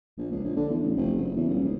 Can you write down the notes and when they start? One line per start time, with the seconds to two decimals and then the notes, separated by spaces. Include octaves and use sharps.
0.18 A#1
0.32 C#2
0.44 A#1
0.56 D3
0.69 E2
0.83 A1
0.97 F1
1.17 F#1
1.36 E2
1.48 D#1
1.64 C#2